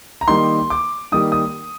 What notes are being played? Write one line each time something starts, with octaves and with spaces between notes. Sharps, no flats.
A#5
D#3 G3 A#3 D#4 C6
D6
D#3 G3 A#3 D#4 D#6
D#6